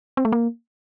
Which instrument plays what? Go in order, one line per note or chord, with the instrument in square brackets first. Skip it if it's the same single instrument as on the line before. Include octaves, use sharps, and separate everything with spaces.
[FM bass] C4
A3
A#3